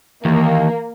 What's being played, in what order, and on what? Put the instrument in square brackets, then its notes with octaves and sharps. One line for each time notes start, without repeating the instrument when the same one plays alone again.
[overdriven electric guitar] D#2 [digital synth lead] E3 [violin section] A#3